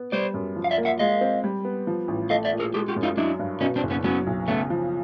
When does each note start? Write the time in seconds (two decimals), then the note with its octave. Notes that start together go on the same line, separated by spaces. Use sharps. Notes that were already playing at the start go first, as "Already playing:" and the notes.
Already playing: B3
0.12 G3 C5 D5
0.34 F#2
0.56 F3
0.64 F5
0.71 D5 E5
0.78 A#3
0.85 E5 F#5
0.99 G#3 D#5 F5
1.21 C4
1.44 G3
1.65 B3
1.87 F3
2.08 A1
2.30 A3 D#5 F5
2.45 D5 E5
2.53 A#2
2.60 G#4 A#4
2.74 G#3 G4 A4
2.88 F4 G4
2.96 F#2
3.03 D#4 F4
3.17 F#3 D4 E4
3.39 G2
3.61 B2 C#4 D#4
3.76 C4 D4
3.83 F#1
3.90 B3 C#4
4.04 F#3 B3 C#4
4.27 B1
4.48 C#3 A3 B3
4.70 F3